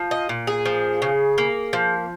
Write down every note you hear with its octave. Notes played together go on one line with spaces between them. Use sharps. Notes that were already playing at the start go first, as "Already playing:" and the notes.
Already playing: F3
D#5
A#2
G#4
F3
C#3
A#3
F3